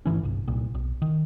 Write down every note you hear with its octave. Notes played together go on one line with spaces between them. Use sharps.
G#1 G#2 E3 C#4
G1 C2
C2 A#2
B1
D#3